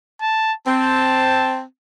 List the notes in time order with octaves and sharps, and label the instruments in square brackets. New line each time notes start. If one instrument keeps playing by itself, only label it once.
[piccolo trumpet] A5
[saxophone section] C4 [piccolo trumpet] A5